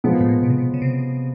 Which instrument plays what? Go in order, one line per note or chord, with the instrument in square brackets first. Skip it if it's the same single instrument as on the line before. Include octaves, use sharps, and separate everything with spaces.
[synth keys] B2 [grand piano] F3 G#3 B3
[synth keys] A#2
A2
A#2
B2
C3
B2
C#3
C3